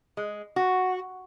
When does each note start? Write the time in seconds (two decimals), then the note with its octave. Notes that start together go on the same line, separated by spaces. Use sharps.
0.17 G#3
0.56 F#4